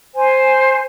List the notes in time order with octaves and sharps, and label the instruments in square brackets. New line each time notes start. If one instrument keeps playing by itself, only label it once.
[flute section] C5 G#5